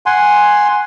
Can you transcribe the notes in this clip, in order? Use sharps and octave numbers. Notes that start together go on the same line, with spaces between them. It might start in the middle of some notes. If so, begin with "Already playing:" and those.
F#5 G#5 C6